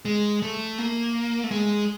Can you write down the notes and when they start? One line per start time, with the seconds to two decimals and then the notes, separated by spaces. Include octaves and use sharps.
0.05 G#3
0.42 A3
0.78 A#3
1.44 A3
1.51 G#3